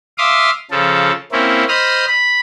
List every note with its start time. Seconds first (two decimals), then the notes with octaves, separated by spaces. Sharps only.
0.18 E5 F5 C6 D6 D#6
0.71 C#3 F3 A4
1.32 A#3 C4 C#4 E4
1.68 C5 D#5 B5 D#6 F6
2.07 B5